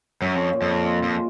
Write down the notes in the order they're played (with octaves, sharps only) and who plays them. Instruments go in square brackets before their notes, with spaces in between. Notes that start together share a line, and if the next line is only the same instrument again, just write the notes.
[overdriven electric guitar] F#2 [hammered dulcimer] C#4
[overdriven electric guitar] F2
[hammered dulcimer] A#2
[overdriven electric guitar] F2
[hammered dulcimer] F4
[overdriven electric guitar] F2
[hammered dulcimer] G#3